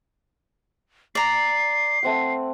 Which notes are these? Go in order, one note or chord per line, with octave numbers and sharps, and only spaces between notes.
D5 A#5 C7
A3 C4 F#5